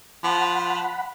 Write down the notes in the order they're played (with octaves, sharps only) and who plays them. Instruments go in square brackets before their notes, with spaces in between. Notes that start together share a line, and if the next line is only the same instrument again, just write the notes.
[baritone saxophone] F3 [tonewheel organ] F#5 B5